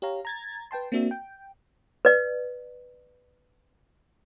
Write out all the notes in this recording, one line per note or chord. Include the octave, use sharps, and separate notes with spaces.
G4 C#5 F5 A#5
A#5 G#6 A6
B4 G5 A5 C6
A#3 C4 D4 F#4 E5
G5
B4 D5